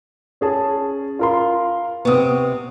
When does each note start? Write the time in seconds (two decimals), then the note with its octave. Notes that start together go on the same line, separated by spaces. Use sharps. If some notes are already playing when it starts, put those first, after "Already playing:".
0.41 C#4 G#4 A5
1.19 F4 A#4 C6
2.05 C3 B3 C#6 D#6